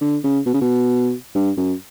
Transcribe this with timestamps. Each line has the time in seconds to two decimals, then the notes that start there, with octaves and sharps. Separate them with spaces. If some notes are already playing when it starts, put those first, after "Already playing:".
0.01 D3
0.24 C#3
0.46 B2
0.54 C#3
0.61 B2
1.35 G2
1.57 F#2